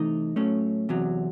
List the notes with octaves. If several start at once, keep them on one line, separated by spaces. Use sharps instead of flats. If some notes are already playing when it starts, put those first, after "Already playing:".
Already playing: C3 E3 A3 D#4 D#5
A2 F#3 A3 C#4
E2 C3 F#3